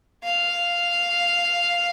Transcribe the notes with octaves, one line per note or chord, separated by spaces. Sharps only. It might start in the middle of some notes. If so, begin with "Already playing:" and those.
F5